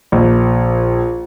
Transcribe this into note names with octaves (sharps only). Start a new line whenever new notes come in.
A#1